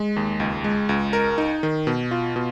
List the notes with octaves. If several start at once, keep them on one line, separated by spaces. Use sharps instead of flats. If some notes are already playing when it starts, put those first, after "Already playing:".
Already playing: G#3
D#2
C#2
G#3
C#2
A#4
D#4
D#3
B2
F4
B2